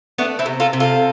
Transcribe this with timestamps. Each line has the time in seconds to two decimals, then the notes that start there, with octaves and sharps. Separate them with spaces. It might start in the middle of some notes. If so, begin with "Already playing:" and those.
0.18 A3 B3 D4
0.39 C4 E4
0.46 C3
0.60 F4 A4
0.73 C3
0.80 F4 A4